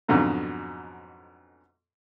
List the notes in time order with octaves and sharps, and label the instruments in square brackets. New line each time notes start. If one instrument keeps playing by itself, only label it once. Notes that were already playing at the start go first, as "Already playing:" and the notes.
[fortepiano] F2 G#2 B2 D3 F#3